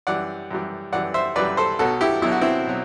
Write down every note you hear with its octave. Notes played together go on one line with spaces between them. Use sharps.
F#2 E3 G3 D5 F#5
F#2 E3 G3
F#2 E3 G3 D5 F#5
C5 E5
F#2 E3 G3 B4 D5
A4 C5
B1 B2 F#3 F#4 A4
E4 G4
B1 B2 F#3 E4
F#4
C4 E4
B2 F#3